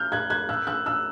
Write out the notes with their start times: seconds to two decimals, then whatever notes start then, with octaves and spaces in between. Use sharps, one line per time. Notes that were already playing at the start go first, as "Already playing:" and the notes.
Already playing: F6 G6
0.12 F#6 G#6
0.30 F#6 G#6
0.49 E6 F#6
0.67 E6 F#6
0.86 E6 F#6